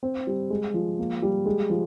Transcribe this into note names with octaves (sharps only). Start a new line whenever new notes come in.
C4
G3
G#3
F3
A#3
G3
G#3
F3